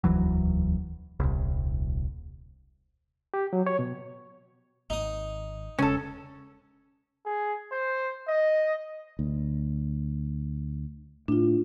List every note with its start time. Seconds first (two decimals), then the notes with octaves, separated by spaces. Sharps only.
0.04 E1 D2 E3 F#3
1.20 D#1 C2
3.34 G4
3.53 F#3
3.67 C#5
3.79 B2
4.90 G#1 D#4 D#6
5.79 E1 C#3 G#3 C#4 A4
7.26 G#4
7.72 C5
8.29 D#5
9.19 D2
11.28 A2 D4 F4